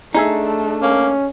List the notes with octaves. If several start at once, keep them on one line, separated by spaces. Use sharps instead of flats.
A3 D4 D#4 G#4 E5
A#3 C#4